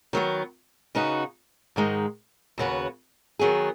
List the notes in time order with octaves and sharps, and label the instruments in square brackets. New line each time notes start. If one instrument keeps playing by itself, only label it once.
[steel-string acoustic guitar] D#3 F#3 B3
C#3 B3 D#4 F#4
G#2 D#3 G#3 D#4
D#2 C#3 B3 F#4 B4
D#3 F#3 B3 G#4